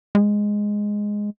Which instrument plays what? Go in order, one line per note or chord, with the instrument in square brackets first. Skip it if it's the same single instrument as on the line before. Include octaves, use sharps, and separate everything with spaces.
[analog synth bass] G#3